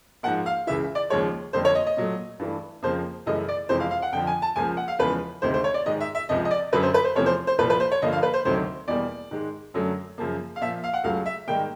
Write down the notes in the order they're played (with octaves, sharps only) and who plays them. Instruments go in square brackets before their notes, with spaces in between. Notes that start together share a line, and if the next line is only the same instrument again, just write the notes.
[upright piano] G#2 F3 A#3 F#5
F5
C#2 C#3 E3 E5
D5
D#2 C#3 F3 G#3 C#5
F2 D3 G3 A#3 C5
C#5
D#5
D#5
A#2 F#3 A3
G2 E3 A3
F2 C#3 F3 A#3 C5
F#2 C#3 E3 A3 D#5
D5
F2 C3 E3 G#3 C5
F5
F5
F#5
F2 D3 F3 G5
G#5
A5
C#2 C#3 F3 A#3 G#5
F#5
F5
E2 C#3 F3 G#3 B4
D2 C3 D#3 G#3 C5
C5
C#5
D5
G#2 D#3 G#3 D#5
E5
E5
C#2 C3 F3 D#5
D#5
D5
F#2 D3 F#3 B4
C5
B4
C5
E2 C3 F3 A3 C#5
C5
C5
C2 A#2 F3 B4
B4
C5
C#5
G2 D3 F3 A#3 D#5
F5
B4
C5
D2 C3 D#3 F#3 A3 C5
E2 B2 G3 A#3 D5
G#2 D#3 G#3
F#2 D3 F#3 A3
F#2 C#3 F3 A#3
F5
A#2 F3 A#3 E5
F5
F#5
C#2 C#3 F#3 A3 F5
E5
G#2 D#3 G3 A#3 G5